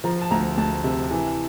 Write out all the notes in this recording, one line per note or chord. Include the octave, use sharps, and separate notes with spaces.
F3 A#5
A5
D2 A#5
D2 A5
C3
E3